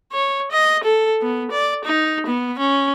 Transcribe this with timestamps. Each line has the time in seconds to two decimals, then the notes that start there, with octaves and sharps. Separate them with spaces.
0.12 C#5
0.51 D#5
0.84 A4
1.22 B3
1.51 D5
1.84 D#4
2.26 B3
2.59 C#4